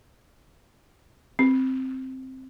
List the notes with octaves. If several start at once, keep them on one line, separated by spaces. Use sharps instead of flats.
C4